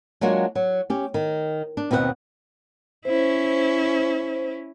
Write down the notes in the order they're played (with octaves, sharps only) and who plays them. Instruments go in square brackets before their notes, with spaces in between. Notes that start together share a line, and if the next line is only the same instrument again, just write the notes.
[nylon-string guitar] F#3 G#3 A#3 D4 F4 F#4
F#3
C#4 G4
D#3
D4
D#2 B2 C4 A4 F#5
[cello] C#4 E4 [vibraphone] C5